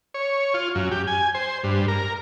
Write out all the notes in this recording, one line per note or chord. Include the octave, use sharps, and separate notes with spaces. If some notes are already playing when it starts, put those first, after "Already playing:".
C#5
F4
F#2
G4
G#5
C5
G2
A#4